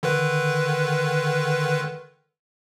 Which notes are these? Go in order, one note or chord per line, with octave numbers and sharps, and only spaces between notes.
D3 D#3 B4